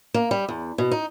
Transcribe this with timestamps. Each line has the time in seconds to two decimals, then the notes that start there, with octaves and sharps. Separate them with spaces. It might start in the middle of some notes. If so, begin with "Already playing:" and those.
0.14 A#3
0.31 G3
0.49 E2
0.78 B2
0.91 D#4